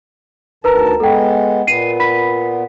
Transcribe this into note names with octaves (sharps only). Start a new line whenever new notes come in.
D2 D#3 A#4 B4 A5 A#5
G#3 B3 A4 G5
A#2 B3 C7 D#7
B5 B6